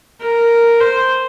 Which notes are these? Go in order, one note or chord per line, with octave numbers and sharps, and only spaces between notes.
A#4
C5